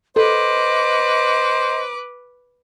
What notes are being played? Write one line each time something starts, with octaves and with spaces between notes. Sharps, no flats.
A4 B4 C5 D#5 D6